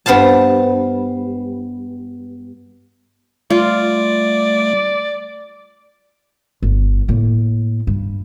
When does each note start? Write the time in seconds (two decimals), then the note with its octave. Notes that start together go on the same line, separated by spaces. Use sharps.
0.06 G2 B3 C5 F5 A5
3.50 G3 A3 F4 D5
6.63 G1 D3
7.08 A2 A#3
7.87 G2